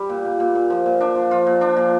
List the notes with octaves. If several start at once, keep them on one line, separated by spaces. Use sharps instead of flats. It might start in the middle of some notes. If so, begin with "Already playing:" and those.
Already playing: G3 G4
A#2
A#2
A#2
A#2
F3
A#2
F3 D4
F3
F3 F4
A#2
F3 D4
A#2